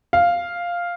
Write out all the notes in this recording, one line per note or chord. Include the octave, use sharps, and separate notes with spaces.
F5